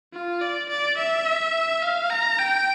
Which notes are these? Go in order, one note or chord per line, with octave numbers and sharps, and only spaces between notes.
F4
D5
D5
E5
F5
A#5
G5